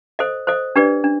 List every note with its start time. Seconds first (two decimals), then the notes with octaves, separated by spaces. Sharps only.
0.19 A4 C5 D#5
0.47 A4 C5 D#5
0.76 D4 G4 B4 D5
1.04 D4